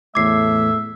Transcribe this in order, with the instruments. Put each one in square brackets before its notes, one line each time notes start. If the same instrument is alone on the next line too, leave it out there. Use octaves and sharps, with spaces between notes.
[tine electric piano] E2 A2 G#6 [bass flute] A3 [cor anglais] E5 [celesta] D6 C7